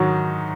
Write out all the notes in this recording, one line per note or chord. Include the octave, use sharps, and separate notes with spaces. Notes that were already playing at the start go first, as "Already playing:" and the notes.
Already playing: G#2 D#3 F#3 D#4 F#4